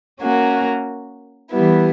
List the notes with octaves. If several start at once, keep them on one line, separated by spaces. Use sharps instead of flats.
A#3 C#4 F#4 A#4
E3 G3 B3 E4